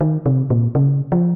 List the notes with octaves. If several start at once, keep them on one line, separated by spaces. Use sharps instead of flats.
D#3
C3
A#2
C#3
F3